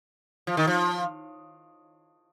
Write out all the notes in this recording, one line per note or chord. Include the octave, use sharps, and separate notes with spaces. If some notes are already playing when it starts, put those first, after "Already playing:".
F3
D#3
F3